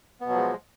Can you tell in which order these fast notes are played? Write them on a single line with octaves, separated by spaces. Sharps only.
B3 B2 F#3 F3 G#3